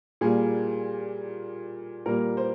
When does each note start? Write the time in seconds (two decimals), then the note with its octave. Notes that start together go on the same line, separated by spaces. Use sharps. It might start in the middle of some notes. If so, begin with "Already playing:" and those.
0.21 A#2 G3 A#3 G#4
2.06 A#2 G3 A#3 A#4
2.37 C5